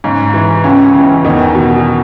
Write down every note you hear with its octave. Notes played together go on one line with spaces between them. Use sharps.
G#2 C#3 C#4
E3
C#2 C#3 C#4
C#3 E3
E2 D#3 D#4
B2